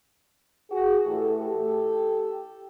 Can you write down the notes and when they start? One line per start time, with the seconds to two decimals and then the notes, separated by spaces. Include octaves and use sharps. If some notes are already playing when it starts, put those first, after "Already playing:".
0.70 F#4 G#4
1.05 A2 E3 A3 G4 A4
1.39 G4 A4